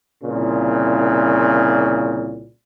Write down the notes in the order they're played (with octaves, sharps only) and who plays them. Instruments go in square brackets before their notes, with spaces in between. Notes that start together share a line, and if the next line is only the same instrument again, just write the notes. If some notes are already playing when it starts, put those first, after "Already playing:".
[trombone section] C2 A#2 C#3